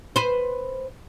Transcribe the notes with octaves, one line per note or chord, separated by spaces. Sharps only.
B4 C5